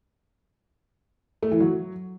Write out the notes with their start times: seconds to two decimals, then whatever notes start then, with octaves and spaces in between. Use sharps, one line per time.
1.43 A3
1.51 E3
1.60 F#3